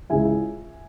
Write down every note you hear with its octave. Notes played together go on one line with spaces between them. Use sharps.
C#2 C#3 E3 E5 G#5